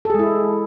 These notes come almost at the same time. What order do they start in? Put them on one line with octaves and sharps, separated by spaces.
A4 G#4 G#3 E4